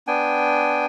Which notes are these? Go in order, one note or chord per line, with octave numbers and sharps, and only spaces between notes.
B3 D4 G5 G#5